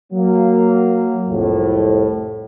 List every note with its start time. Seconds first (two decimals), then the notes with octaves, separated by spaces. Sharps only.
0.13 F#3 A#3
1.28 C2 F2 A2